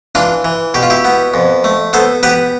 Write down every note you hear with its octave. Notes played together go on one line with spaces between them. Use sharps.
E3 D4 F4
E3
B2 G4
F4
E4 G4
B3
F2
A3
B3 A4 C5
B3 G4 B4